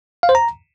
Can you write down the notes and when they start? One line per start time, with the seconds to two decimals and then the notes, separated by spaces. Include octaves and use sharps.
0.23 F5
0.29 C5
0.35 A#5